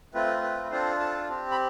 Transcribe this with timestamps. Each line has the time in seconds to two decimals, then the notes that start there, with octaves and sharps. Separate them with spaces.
0.14 A3 C4 F4 B4
0.43 B4
0.71 C4 D4 F4 A4 C5
1.00 A4 A5
1.29 C4 G4
1.51 B5